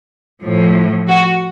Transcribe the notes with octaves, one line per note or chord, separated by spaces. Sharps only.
A2 F3
F#4